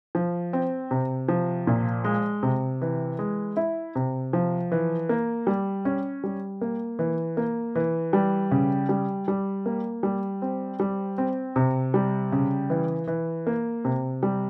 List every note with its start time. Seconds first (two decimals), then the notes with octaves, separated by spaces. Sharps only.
0.15 F3
0.53 C4
0.91 C3
1.28 F3
1.67 A#2
2.04 G#3
2.43 C3
2.82 E3
3.19 G#3
3.57 E4
3.95 C3
4.33 F3
4.72 E3
5.09 A#3
5.47 G3
5.85 C#4
6.24 G3
6.61 A#3
6.99 E3
7.37 A#3
7.75 E3
8.13 G3
8.51 C#3
8.89 G3
9.28 G3
9.66 A#3
10.03 G3
10.42 C4
10.80 G3
11.18 C4
11.56 C3
11.94 G3
12.32 C#3
12.70 E3
13.07 E3
13.47 A#3
13.85 C3
14.23 G3